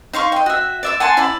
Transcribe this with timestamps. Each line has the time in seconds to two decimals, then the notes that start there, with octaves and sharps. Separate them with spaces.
0.13 D#4 F5 C6 C#6
0.32 D#5 G5
0.46 F#4 E5
0.83 D5 E5 D6
1.00 F#5 G#5 A5 C6
1.17 E4 D5 B5